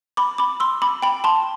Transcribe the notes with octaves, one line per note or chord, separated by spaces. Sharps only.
B5 D6
B5 D6
C6 E6
B5 D6
G5 B5
A5 C6